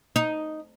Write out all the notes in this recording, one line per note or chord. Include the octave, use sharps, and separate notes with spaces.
D#4